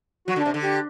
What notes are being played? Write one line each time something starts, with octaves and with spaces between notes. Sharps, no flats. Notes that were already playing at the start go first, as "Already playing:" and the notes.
F#3 F#4
D3
D4
C3
D3
G4